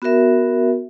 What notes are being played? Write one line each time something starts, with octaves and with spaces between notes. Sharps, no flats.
B3 F#4 A#4 E5